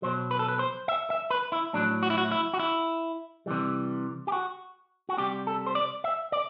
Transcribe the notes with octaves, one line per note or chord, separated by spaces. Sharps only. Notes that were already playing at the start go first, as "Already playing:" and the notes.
B2 F#3 C5
B4
A4
B4
C5
E5
E5
B4
E4
A2 F#3 D4
F#4
E4
F#4
E4
F#4
E4
C3 E3 G3
G4
F#4
F#4
C3 G3 G4
A4
C5
D5
E5
D5